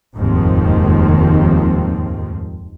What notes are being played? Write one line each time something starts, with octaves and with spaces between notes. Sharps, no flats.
F1 D#2 G#2 D#3 F3 C4